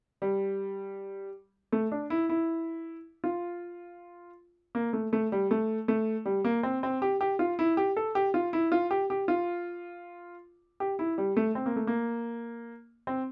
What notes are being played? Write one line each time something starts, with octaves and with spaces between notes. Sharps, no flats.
G3
A3
D4
E4
E4
F4
A#3
A3
A3
G3
A3
A3
G3
A#3
C4
C4
G4
G4
F4
E4
G4
A4
G4
F4
E4
F4
G4
G4
F4
G4
E4
G3
A3
C4
A#3
A3
A#3
C4